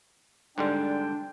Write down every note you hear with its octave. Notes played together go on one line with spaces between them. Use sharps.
G#2 D3 G3 D4 G5